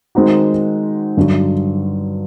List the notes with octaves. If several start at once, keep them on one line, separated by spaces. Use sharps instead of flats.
D#3 G#3 C4 D#4 F#4
G2 D3 F#3